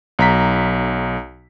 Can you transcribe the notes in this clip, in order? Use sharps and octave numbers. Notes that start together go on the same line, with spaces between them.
B1 A#5 B6